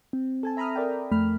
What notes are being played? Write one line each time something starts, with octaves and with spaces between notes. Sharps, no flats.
C4
A4 G#5 A5
E5 A#5 B5 D#6 F6
A#4 D5 G5
F2 A3 B5 F6